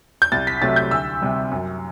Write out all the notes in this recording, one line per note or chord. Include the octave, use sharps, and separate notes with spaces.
G6
C2 A6
B6
C3 F#3 A3 A6
G6
D2 E6
C3 G3
F#2